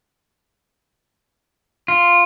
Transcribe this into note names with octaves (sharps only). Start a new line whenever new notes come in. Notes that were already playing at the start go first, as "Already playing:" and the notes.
F4